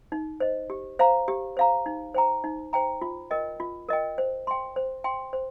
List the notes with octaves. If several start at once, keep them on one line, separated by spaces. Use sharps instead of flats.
D#4
C5 D#5
G4
C5 F5 A#5
G4
C5 F5 A#5
D#4
C5 G5 A#5
D#4
C5 G5 A#5
F4
A#4 D#5 G5
F4
A#4 D#5 G5
C5
G5 C6
C5
G5 C6
C5